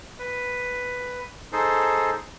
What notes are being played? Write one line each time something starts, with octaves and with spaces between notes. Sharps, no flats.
B4
D#4 G#4 A4 C5